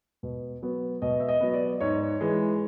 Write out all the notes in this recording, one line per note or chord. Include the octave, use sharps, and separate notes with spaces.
B2
F#3 B3
B2 D#5
E5
D#5
F#3 B3
D5
G#2 C#5
E3 G#3